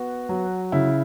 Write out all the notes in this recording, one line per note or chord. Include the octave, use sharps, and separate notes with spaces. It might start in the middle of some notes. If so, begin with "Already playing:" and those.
Already playing: B3 F#4
F#3
C#3 E4